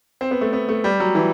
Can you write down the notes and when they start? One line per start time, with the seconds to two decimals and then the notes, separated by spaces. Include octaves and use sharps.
0.21 C4
0.31 B3
0.41 A3
0.53 B3
0.69 A3
0.84 G3
1.00 F#3
1.15 E3